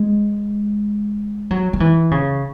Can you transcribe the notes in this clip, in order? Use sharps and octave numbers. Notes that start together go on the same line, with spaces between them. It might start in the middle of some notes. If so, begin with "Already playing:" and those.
Already playing: G#3
F#3
F#3
E3
C#3